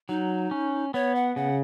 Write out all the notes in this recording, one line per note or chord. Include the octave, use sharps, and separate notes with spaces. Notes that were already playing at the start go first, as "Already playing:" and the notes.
F#3 D#4
C#4
B3 C#5
F#5
C#3 F#5